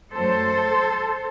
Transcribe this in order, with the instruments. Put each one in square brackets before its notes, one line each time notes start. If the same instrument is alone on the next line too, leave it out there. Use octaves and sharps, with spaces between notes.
[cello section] F#2 F#3 A3 A4 C5